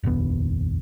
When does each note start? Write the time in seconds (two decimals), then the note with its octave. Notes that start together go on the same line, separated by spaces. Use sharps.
0.03 F1 A#1 D#2 B3